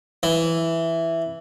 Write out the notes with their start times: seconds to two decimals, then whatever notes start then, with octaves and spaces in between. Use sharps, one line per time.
0.23 E3